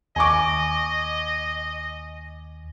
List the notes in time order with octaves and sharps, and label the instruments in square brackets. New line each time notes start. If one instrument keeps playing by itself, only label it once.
[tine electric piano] D#2 [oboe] D#5 [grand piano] G#5 C#6 D6